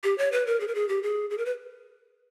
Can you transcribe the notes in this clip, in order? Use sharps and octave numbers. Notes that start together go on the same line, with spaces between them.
G4
C#5
B4
A#4
G#4
A#4
G#4
G4
G#4
G#4
A#4
B4